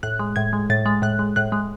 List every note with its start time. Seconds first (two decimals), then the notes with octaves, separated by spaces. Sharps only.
0.03 A2 F#6
0.19 G#3
0.36 A2 G#6
0.53 G#3
0.70 A2 A6
0.86 G#3
1.02 A2 F#6
1.19 G#3
1.36 A2 F#6
1.52 G#3